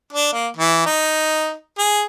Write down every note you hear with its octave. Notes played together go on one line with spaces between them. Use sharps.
D4
A#3
E3
D#4
G#4